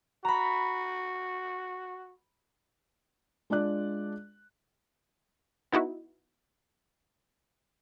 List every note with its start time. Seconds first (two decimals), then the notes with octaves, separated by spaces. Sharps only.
0.25 F#4 A#5 B5
3.50 G#3 D4 F4 D5 F#6
5.72 B3 D#4 E4 F#4